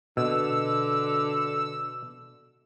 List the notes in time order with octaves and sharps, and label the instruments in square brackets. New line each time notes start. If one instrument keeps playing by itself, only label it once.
[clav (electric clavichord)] B2 [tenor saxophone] D3 [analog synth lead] E6